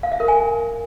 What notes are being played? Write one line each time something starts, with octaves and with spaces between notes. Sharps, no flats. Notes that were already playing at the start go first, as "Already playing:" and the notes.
F5
E5
A#4
G#5